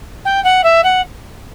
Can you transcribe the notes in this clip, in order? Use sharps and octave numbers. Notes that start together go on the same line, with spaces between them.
G5
F#5
E5
F#5